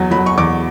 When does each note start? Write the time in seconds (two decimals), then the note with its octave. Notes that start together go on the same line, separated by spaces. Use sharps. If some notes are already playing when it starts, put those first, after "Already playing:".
Already playing: E2 F#3 G#5
0.11 F#3 B5
0.26 C#6
0.37 E2 D6